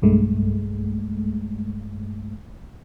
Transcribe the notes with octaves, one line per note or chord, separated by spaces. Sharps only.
B1 G2 G#3 A3